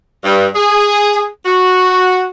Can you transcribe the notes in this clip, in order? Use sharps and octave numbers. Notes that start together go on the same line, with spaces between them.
G2
G#4
F#4